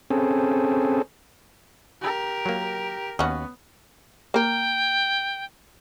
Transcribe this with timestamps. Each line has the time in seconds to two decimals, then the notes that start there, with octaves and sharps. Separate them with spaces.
0.10 C4 C#4 G#4 A4
2.01 G4 A#4
2.46 F#3 A#3
3.19 D#2 B3 C#4 F#4
4.34 A#3 A#4 G5